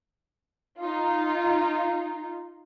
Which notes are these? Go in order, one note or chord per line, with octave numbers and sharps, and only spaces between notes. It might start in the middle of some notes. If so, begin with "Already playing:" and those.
D#4 F4